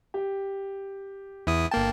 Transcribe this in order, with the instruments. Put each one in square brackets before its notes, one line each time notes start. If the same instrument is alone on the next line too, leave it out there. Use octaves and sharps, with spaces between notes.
[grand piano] G4
[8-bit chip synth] E2 E4 D#6
[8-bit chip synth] G1 A#3 A5 [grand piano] G5